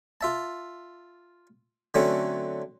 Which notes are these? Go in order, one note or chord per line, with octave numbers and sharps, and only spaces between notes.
F4 E5 A5
D3 F#3 A3 C4 C#4